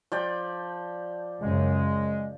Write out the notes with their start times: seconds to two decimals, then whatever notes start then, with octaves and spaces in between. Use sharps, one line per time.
0.12 F3 D5 G5
1.41 F#2 C#3 G#3